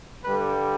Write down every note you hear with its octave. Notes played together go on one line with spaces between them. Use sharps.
G2 D3 G3 B4